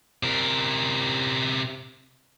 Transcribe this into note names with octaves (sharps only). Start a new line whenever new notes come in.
C3 A#4